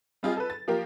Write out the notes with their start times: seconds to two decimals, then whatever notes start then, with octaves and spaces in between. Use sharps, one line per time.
0.23 G3 C4 F4 G4 G#4 D#5
0.37 A4 B4
0.50 A6
0.68 F3 A#3 G4 A#4